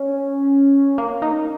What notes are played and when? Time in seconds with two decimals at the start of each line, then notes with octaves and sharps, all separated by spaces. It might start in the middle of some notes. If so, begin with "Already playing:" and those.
Already playing: C#4
0.98 A#3
1.22 D#4